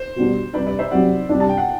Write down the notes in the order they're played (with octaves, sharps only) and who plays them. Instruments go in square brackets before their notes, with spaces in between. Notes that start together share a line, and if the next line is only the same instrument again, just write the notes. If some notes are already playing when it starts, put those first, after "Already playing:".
Already playing: [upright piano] C5
[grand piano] B2 G3 B3 D4
[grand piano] C3 G3 D4 [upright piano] B4 D5
[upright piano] B4 D5
C5 E5
[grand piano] C3 F#3 C4 [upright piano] D5 F#5
[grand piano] C3 G3 D4
[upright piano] A5
G5
F#5